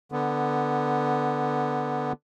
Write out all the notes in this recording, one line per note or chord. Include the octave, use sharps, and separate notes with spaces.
D3 B3